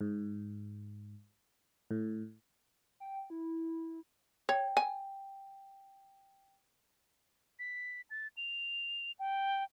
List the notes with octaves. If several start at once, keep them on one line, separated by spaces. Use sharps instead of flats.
G#2
A2
G5
E4
C#5 G5
G#5
B6
A6
F7
G5